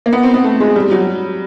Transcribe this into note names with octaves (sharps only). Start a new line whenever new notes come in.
A#3
B3
C4
B3
A3
G#3
G3
F#3